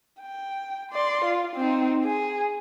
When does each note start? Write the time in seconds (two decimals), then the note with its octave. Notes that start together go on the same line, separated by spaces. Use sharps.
0.21 G5
0.92 D5 C6
1.25 F4
1.56 C4 D#4
2.05 G#4